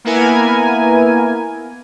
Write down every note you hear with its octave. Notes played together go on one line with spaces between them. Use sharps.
A#3 B3 E4 A#4 G#5